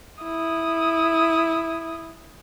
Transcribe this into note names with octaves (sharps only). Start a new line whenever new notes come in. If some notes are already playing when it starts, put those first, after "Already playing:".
E4 D#6